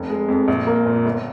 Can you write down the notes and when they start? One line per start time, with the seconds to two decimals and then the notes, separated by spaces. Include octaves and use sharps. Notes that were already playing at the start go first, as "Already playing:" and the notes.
Already playing: F1
0.10 G#3
0.29 F2
0.48 A#1
0.67 A#3
0.86 A#2
1.05 G1